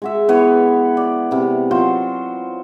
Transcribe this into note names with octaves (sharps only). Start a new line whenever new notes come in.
G#3 F#4 E5
E3 B3 C#5
D5
C3 B3
F#3 F4 F#4 C5